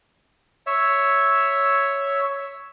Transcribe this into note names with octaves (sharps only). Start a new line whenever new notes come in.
C#5 E5